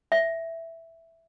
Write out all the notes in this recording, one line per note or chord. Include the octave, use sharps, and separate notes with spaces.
E5